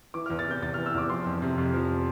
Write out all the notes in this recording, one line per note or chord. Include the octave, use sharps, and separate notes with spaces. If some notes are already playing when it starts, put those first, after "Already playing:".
E3 D6
E2 F6
A6
C3 G6
E2 A6
E3 F6
E6
E2 D6
F3 C6
F2
C3
F2
F3